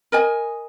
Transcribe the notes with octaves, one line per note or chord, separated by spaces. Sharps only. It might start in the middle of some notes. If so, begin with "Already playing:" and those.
A#4 D#5 G#5